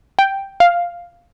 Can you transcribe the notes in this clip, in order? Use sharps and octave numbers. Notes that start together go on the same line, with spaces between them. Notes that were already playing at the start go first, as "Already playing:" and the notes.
G5
F5